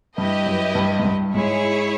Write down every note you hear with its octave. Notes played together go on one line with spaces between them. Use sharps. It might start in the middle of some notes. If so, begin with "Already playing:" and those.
G2 E4 G4 B4 D#5
F#2
G2
G#2
G2
G#2 E4 G#4 C#5